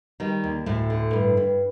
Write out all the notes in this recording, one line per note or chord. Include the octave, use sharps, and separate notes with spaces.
D#3 G3
D#2
D2 A2 A3
D3
G2
G2